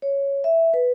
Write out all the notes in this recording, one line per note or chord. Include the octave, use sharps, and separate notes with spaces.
C#5
E5
B4